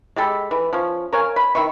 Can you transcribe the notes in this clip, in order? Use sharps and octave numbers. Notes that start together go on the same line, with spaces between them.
G#3 G4 A4 B5
E3
F3 C#4
A#4 C#5 F5 G#5
B5
D#3 E4 E5 C#6